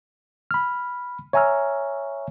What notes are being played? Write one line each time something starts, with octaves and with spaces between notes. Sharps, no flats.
B5 F6
C#5 E5 G#5 A#5 E6 F6